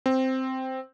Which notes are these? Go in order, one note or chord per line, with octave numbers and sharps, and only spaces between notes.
C4